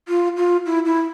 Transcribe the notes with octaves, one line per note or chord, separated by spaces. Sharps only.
F4
F4
E4
E4